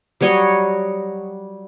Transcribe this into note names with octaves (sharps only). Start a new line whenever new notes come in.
F#3 G3 C#5 D#5